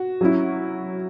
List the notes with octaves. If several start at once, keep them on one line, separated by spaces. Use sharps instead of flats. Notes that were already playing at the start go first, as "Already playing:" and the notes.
Already playing: F#4
F#3 C#4 E4